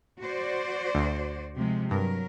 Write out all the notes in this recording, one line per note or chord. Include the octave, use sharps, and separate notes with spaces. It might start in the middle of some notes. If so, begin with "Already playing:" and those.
F#4 C5 D5
D2
C3 F3 G#3
G2 F#3 A#4